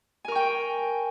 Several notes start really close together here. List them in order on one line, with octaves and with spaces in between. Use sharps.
G#5 A#4 C#6 G5